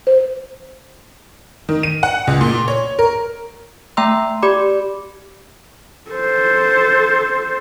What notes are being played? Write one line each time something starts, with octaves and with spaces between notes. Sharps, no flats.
C5
D#3
D#7
F#5
C#2
A#2
C#5
A#4
A3 E5 G5 A#5 C6 E6
G4 D5 B5 D6
A4 C5